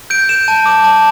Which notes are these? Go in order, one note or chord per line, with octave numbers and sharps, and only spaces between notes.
G6 D7
G6 E7
A5
D6
A5